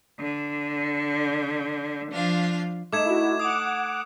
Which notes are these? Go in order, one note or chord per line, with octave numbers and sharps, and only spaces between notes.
D3
F3 D4 F4 F5
A3 D#4 D6 G#6 E7
E4 F#4
F#5 D6 D#6